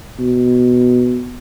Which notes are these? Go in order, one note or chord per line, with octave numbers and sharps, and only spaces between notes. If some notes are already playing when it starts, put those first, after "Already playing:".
B2